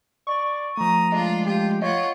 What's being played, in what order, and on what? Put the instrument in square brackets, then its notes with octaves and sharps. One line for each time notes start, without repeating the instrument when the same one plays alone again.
[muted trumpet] D5 [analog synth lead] C#6
[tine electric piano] F3 A3 [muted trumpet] A#5 [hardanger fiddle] D#6
[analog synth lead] G#3 [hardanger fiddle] D4 F4
[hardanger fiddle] F4 [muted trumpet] G4
[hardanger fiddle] F4 F#5 [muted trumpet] C#5 [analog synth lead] D#5